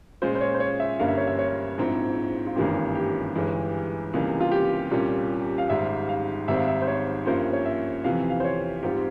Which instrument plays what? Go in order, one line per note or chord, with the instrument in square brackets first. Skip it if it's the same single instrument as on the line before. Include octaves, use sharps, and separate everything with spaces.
[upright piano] A#2 G#3 C#4 F4 [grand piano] C5
[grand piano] C5
C#5
C5
C#5
E5
[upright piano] G1 G2 G3 A#3 C#4 [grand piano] F5
[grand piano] E5
C#5
E5
C#5
[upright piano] A#1 G#2 F3 C4 E4
[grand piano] F4
[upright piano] G#1 G2 E3 A#3 C#4 [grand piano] G4
[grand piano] G4
[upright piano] G1 G2 E3 G#3
C#2 C3 E3 G3 A#3
[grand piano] F4
G4
[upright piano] C2 A#2 G3 A#3 C#4
[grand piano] F5
[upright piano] G#1 G#2 G3 [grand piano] E5
[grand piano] F5
[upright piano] G#1 G#2 G3 C4 [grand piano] E5
[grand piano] F5
E5
C5
C#5
[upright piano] G2 F3 A#3 C#4 [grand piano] C5
[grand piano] C#5
E5
[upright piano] F2 C3 E3 [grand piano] F5
[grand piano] F5
C5
C#5
[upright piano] G#2 G3 C4 F4 [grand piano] G4